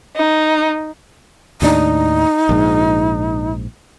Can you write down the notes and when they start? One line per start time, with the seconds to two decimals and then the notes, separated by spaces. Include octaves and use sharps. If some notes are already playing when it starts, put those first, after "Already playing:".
0.16 D#4
1.62 D#2 A2 D4 D#4
2.49 A#1 G#2